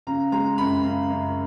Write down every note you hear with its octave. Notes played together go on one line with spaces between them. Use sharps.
C#3 A#5
G#3 A#5
F#2 B5
C#3
F#2